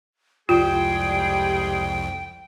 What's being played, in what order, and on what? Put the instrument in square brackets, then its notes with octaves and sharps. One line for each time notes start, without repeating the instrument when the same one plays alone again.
[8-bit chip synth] C2 F2 [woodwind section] G3 G#3 G#4 [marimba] F4 [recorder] G5